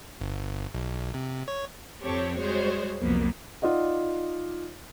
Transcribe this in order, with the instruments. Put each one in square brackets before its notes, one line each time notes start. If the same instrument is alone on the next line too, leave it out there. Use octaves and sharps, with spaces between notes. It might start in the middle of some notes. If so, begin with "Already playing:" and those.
[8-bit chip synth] G1
B1
C3
C#5
[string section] F2 F3 C4 G4 A4 C#5
G3 G#3 F#4 C5 C#5
C2 F2 F3 F#3 A#3 B3
[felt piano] D#4 F4 D5 D#5 F#5